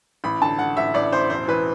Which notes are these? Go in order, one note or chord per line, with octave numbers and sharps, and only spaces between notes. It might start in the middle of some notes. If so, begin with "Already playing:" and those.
A1 B5
D3 A5
D3 F#5
A1 E5
A1 D5
A1 C5
E1 C5
E3 B4